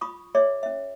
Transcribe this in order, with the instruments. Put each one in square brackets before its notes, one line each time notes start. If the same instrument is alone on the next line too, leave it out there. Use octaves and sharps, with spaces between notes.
[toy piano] F4 B5 C#6 D#6
G#4 C#5 D5 E5
C#4 E5